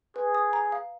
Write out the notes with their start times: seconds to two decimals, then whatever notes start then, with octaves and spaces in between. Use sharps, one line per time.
0.16 G#4 B4
0.35 D#6
0.53 A#5
0.72 F5